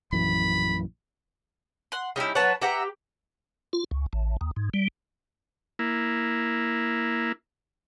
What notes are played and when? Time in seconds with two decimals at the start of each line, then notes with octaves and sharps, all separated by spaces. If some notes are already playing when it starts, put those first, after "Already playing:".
0.12 A#1 F#2 E3 B5
1.92 F#5 C6
2.16 G3 C#4 D#4 E4 G5
2.35 F#3 B4 C#5 F#5 A5
2.62 G4 B4 E5 F#5 G5 A#5
3.73 F4
3.91 C#2
4.13 A1
4.41 D#2
4.56 G#2
4.74 G3
5.79 A#3 E4